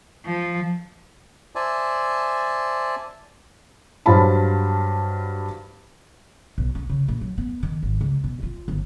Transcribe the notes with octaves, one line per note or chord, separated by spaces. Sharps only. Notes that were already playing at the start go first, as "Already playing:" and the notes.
F3
C5 D5 E5 G#5 A5
G2 F#3 C5 F5 A5 B5
B1
C#4
C#3
A#1
F#3
B3
D#3
G#1
C#2
B2
F4
G1